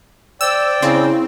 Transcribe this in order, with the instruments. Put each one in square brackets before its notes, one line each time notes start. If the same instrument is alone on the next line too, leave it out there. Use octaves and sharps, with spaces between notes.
[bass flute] C5 [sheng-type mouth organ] D5 G5 [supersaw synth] E6
[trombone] C#3 [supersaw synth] C4 [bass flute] E4